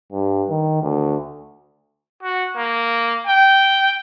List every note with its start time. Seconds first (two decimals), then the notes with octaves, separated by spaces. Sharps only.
0.12 G2
0.50 D#3
0.82 D2
2.23 F#4
2.57 A#3
3.27 G5